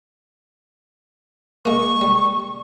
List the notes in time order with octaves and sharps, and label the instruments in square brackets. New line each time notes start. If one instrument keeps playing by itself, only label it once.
[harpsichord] G#3 A#3 [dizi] C#6
[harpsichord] G3